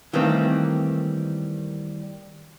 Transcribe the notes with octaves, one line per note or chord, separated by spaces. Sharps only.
D#3 E3 G3 A3 A#3 C4